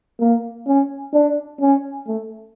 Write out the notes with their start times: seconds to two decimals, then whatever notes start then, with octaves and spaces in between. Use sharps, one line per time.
0.20 A#3
0.67 C#4
1.14 D4
1.61 C#4
2.07 A3